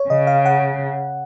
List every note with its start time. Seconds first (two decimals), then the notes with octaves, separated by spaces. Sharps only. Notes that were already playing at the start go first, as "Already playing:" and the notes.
Already playing: C#5
0.10 C#3 D#5
0.27 F5
0.46 F#5